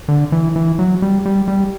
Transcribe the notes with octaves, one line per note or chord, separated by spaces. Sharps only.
D3
E3
E3
F#3
G3
G3
G3